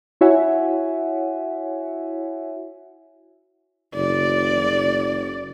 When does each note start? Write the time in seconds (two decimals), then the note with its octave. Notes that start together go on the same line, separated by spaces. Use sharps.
0.21 E4 F#4 C#5 E5 F#5 G#5
3.94 F#1 D5